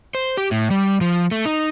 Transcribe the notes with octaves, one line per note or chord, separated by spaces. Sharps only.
C5
G4
A2
G3
F3
A3
D#4